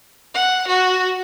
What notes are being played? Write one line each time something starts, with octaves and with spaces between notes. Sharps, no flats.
F#5
F#4